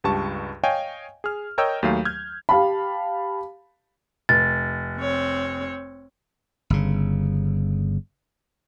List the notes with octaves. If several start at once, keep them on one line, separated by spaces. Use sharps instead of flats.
C#2 G2 G4 A5 C#6
C#5 D#5 F5 G5 G#5
G#4 F6
A#4 C#5 D#5 G5 E6 G6
D#2 F#3 A3 F5
F6 G6 G#6
G4 F5 A5 B5
F1 A6
C4 C#5
G1 C#3